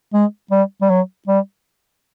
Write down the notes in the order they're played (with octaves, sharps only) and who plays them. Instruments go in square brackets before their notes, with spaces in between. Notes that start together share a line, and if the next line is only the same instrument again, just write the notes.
[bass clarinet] G#3
G3
G3
F#3
G3